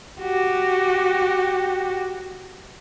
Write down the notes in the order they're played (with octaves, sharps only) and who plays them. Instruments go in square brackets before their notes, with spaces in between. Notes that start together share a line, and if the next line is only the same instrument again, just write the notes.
[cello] F#4 G4